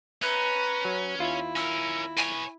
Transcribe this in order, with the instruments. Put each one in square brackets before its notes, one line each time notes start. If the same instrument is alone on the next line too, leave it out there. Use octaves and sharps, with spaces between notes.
[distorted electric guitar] C#4 [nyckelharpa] B4 A#5 [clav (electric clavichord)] E5 [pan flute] F#6
[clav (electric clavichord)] F#3
[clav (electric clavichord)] D#2 F4 E5 [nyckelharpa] E4
[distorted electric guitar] C#4 A#4 [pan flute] E6
[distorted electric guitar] B4 C#5 [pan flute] G#5